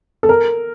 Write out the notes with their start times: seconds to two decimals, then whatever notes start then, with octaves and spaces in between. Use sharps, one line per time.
0.23 A4
0.29 A#4